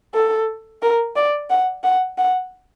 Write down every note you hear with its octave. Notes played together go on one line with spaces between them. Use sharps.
A4
A#4
D5
F#5
F#5
F#5